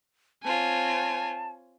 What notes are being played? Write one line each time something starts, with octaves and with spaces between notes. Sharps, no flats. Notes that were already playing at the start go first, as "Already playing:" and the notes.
C4 F4 C#5 G#5 A5